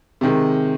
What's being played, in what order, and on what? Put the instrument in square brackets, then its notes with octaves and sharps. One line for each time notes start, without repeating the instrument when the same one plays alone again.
[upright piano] C3 D#3 G#3